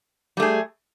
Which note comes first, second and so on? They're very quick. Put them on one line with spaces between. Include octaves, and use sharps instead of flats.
G3 A3 G#4